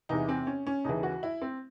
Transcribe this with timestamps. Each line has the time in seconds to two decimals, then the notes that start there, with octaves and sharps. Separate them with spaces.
0.09 E2 C3 E3 D#4
0.28 C4
0.47 C#4
0.67 C#4
0.84 D#2 C#3 E3 D#4
1.03 F#4
1.23 E4
1.42 C4